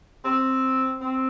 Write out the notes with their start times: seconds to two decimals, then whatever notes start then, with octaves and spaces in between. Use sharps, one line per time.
0.25 C4
1.01 C4